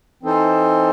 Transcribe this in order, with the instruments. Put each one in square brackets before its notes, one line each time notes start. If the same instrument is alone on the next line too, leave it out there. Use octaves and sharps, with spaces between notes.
[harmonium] E3 C4 D#4 A4 C5